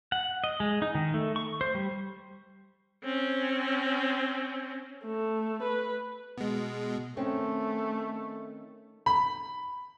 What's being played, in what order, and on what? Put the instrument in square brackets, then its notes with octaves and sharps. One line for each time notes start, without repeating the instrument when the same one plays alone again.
[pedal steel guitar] F#5
D#5
G#3
D#4
D#3
A3
C#6
C5
G3
[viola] C4 C#4
A3
B4
[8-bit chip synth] B2 G#3
[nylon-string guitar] D#3 C4 C#4 [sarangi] A3
[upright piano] B5